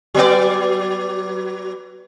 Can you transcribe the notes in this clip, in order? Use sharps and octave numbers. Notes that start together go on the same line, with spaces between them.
F#3 B3 D5